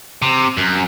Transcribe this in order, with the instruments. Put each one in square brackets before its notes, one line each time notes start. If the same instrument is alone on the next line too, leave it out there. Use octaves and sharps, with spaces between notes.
[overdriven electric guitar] C3
F#2